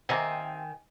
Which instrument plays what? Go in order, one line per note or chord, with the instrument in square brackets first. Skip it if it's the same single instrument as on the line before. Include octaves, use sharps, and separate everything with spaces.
[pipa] C3 A#3 C4 [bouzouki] D#3 G#5